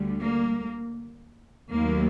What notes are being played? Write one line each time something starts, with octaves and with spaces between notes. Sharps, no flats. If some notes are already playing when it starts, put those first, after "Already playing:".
Already playing: D2 D3 G3
A#3
D#2 D#3 F#3 A3 A#3